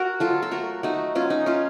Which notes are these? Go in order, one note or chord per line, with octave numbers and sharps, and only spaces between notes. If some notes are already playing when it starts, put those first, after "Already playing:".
Already playing: F#4 A#4
F#3 F4 A4
A4
A3 F#4 A#4
A3 D#4 F#4
F#3 C#4 F4
D#4
A3 C#4 F4